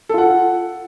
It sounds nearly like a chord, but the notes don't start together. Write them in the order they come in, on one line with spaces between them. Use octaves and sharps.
A4 F4 F#5